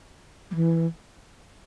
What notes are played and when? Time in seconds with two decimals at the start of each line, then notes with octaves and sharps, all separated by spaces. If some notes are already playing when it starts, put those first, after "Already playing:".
0.51 G3
0.55 E3